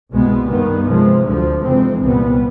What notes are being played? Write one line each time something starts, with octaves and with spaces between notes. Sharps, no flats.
C2 B2 G#3 B3
G2 D#3 G3 B3
C3 F3 G#3
D2 D3 F3
F2 C3 E3 G#3 C4
C2 A#2 G3 B3